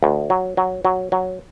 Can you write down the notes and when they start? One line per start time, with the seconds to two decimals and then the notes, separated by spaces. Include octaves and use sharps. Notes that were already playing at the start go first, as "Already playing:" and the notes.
0.03 D2
0.30 F#3
0.57 F#3
0.85 F#3
1.12 F#3